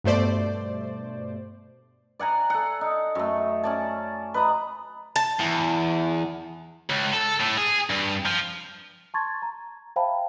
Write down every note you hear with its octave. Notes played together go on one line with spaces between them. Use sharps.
G2 B2 A3 C5 D5
D5 F#5 G#5 A#5
A4 F#5
D#4
F#2 A3
C#4 D5 A5
B4 D#5 A#5 B5
A5
E2
C#2
A4
A2
G#4
G2
F3
A5 C6 C#6 G#6 A6
A#5
C5 E5 F5 G5 A5 B5